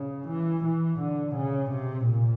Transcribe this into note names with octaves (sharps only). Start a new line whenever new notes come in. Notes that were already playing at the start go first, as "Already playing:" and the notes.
Already playing: C#3
E3
E3
D3
C#3
C3
A#2